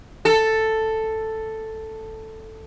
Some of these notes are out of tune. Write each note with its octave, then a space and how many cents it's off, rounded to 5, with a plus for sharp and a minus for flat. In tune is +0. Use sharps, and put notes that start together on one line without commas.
A4 +5